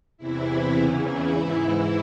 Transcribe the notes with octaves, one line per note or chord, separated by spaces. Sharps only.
E2 C3 E3 E4
E2 C#3 E3
E4
G#2 E3
E4